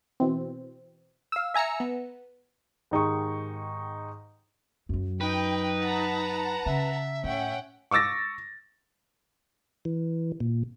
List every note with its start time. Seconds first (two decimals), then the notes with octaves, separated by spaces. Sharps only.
0.20 B2 E3 C4
1.32 F5 E6
1.54 E5 G#5 A#5 E6 C#7
1.80 B3
2.91 G#2 D#3 D#4 G4 G#4 C#6
4.89 F#2 F#3
5.21 D#4 B4 G5
5.79 F#5 A5 A#5
6.66 C#3 E5
7.24 A2 C#4 F#5 G5
7.91 C#6 D6 E6 A6 A#6
9.85 E3
10.40 A#2